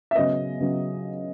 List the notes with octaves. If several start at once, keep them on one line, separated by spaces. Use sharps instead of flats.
E5
C#3 F#3 B3 D#5
C#3 F#3 B3